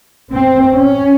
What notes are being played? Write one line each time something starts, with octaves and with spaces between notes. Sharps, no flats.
C4
C#4